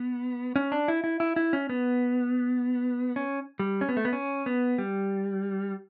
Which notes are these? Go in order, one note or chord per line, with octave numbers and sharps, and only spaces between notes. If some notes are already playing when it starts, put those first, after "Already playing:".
Already playing: B3
C#4
D4
E4
E4
E4
E4
C#4
B3
C#4
G3
C#4
B3
A3
B3
C#4
B3
G3